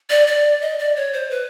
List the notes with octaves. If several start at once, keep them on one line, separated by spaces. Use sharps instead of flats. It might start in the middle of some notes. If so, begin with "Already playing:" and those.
D5
D5
D#5
D5
C#5
C5
B4